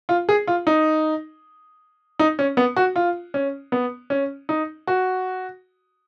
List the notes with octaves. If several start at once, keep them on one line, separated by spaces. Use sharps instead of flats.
F4
G#4
F4
D#4
D#4
C#4
B3
F#4
F4
C#4
B3
C#4
D#4
F#4